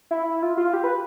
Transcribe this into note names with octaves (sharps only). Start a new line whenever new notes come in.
E4
F4
F4
G4
B4